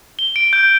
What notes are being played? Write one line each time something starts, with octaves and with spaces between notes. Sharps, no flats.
G7
D7
G6